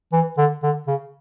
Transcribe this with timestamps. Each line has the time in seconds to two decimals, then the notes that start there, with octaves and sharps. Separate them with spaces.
0.12 E3
0.38 D3
0.63 D3
0.87 C#3